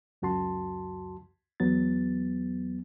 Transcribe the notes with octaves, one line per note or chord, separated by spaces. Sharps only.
C#2 F#2 F#4 A5 C6
E2 F#3 B3 A6